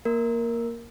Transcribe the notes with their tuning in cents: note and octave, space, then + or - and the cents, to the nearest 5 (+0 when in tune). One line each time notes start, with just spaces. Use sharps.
A#3 +0 A#4 +0